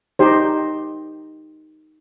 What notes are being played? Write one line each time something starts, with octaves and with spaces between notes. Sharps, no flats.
D#4 G4 C5